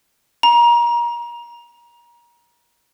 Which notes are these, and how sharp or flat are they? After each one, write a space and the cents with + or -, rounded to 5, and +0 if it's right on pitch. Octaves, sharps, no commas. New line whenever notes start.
A#5 +30